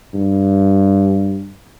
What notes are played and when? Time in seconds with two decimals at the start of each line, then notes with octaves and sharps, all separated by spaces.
0.14 G2